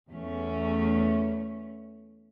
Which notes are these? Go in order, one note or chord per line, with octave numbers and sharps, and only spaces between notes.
E2 A3 C#4